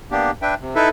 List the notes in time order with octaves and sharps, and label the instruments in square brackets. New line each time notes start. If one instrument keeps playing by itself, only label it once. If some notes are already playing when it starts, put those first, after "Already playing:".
[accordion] A#3 B3 D4 G4
D4 B4 E5 G5
C3
D#4 E4 A4 B4 E5